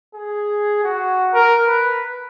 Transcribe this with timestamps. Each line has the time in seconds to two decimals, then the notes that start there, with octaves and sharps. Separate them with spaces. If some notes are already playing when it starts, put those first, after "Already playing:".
0.15 G#4
0.84 F#4
1.34 A#4
1.68 B4